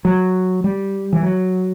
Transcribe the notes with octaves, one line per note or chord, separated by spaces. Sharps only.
F#3
G3
E3
F#3